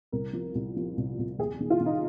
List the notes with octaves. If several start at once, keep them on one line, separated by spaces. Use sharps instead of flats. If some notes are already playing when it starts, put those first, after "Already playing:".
C2 A#4
F3
C2
F3
C2
C2
D#2 G#4
D#3
F4
D#3
D#4